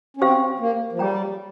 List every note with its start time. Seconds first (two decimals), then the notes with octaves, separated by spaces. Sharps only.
0.17 C#4
0.21 C4 G4 C5 F5
0.60 A#3
0.92 F3
0.99 G3 G#4 C#5 G5 A#5